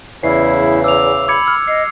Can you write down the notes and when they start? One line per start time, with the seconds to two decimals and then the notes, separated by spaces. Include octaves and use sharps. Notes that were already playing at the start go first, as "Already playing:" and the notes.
0.24 E2 C#3 E4 C7
0.84 D6 E6 F7
1.28 B5 D6 G#6 C#7
1.46 E6 F6
1.68 D#5 C7